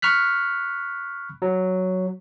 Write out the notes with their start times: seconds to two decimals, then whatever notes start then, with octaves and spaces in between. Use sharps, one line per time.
0.02 B5 C#6 F6 F#6 B6
1.42 F#3